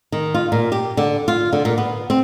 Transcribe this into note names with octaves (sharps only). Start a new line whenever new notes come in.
D#3
F4
A#2
G4
D3
F4
D3
A#2
B3
C4